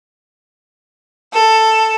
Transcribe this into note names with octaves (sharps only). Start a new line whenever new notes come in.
A4